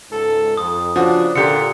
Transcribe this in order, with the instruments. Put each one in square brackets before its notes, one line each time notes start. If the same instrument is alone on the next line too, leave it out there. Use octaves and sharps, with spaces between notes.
[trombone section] C#2 G#2 A4
[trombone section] F2 [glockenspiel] D#6
[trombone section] C#3 F#3 D4 [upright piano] F3 F#4
[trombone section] A#2 [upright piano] D3 G4 [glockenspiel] C#7